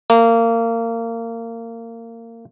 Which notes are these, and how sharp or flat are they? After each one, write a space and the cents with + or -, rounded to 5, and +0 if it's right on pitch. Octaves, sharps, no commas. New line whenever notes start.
A#3 -25